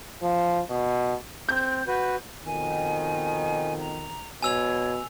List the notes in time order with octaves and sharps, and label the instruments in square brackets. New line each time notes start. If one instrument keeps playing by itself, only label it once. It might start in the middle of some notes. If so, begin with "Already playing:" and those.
[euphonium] F3
B2
[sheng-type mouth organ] C4 [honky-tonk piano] G6
[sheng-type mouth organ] F#4 B4
[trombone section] F2 B2 D#3 [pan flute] G#5
[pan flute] A#5
[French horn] B2 [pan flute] C#5 [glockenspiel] G#5 E6 F7